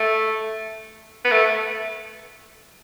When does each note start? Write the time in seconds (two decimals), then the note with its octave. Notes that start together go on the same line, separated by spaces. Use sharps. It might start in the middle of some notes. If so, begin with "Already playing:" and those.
Already playing: A3
1.25 B3
1.32 A3